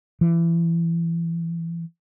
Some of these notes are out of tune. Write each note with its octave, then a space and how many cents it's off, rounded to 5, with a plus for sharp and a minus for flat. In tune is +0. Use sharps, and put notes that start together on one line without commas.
E3 +25